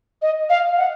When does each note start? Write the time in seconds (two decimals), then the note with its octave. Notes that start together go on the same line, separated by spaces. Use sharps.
0.22 D#5
0.50 F5
0.77 F#5